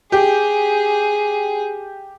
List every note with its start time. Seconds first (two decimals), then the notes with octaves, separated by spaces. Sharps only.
0.12 G4 G#4